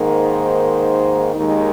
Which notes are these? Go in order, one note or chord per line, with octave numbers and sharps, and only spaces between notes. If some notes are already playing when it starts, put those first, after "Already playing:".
Already playing: G#2 D#3 A#3
C5
D#2 D#3 G#3 D#4